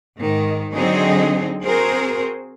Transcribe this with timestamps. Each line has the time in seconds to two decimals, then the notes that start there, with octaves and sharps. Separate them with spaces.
0.18 G#2 D#3
0.73 D3 F#3 C4 D#4 G#4 D#5
1.64 C4 F#4 G#4 A#4 C5